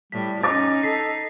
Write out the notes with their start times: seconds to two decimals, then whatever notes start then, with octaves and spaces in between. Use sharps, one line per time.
0.12 A2 G3 B6
0.43 C#4 D#4 D6 A6 A#6
0.83 A4 B6 C7